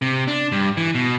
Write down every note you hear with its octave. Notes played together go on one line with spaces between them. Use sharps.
C3
D4
G2
E3
B2